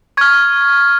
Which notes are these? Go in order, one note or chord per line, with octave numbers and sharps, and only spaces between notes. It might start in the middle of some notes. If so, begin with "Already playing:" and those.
C#6 F6 G#6